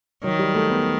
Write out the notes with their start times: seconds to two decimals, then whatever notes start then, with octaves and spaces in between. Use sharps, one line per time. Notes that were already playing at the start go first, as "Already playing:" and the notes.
0.24 D#3 F#3
0.39 G3
0.55 A3
0.70 B3